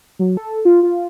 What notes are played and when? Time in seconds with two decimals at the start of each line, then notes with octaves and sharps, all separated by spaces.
0.19 F#3
0.37 A4
0.65 F4
0.83 F4